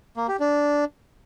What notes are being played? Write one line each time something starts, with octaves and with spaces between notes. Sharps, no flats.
A#3
G4
D4